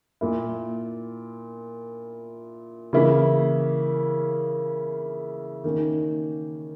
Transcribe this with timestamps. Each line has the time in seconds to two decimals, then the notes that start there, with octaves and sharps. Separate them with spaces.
0.21 A#2 A#3 E4
2.93 C#3 E3 A#3 E4
5.64 D#3 A#3 C#4